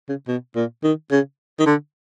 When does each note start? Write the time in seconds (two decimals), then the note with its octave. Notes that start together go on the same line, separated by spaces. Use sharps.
0.09 C#3
0.28 B2
0.56 A#2
0.84 D#3
1.11 C#3
1.60 D#3
1.66 D3